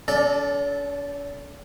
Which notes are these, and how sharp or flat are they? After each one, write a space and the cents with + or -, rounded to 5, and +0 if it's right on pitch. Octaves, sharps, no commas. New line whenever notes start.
C#4 +45 A4 -15 D5 +0